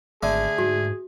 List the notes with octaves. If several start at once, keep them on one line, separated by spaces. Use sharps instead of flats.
G#1 D3 A3 G#4
G#2 F#4